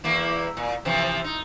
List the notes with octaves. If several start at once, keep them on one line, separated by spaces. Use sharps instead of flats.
E2 A#3 E4
A#2
C3 E3 F3
D#4